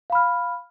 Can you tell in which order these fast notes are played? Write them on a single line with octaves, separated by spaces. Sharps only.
F5 B5 F6